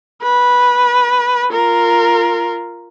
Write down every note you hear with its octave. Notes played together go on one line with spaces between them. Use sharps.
B4
F4 A#4